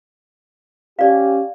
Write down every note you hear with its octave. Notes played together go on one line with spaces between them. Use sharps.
C#4 G4 D5 F5